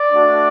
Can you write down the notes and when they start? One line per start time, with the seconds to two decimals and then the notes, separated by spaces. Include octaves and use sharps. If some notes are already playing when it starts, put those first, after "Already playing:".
Already playing: D5
0.12 A3 D4 F#4